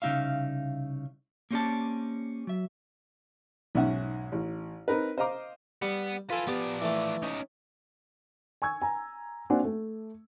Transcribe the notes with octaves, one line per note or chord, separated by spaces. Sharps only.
C2 C#3 D4 D#4 E5 F5
A#3 C4 C#4 G4 D5 A5
F#3 E5
B1 G#2 C#4 E5 F#5
A1
C4 D#4 A#4 B4
C5 D#5 F5 A#5 D6
G3 B3
F4 A4 B4 G#5
F3 B3 G4 D5 D6
E3 A3
C#4 D#4
G#5 C#6 E6 G#6
G#5 A#5
A#3 C4 D4 F#4 F#5 G#5
A3